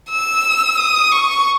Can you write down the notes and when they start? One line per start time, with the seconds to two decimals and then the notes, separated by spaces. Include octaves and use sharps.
0.10 E6
0.77 D#6
1.12 C#6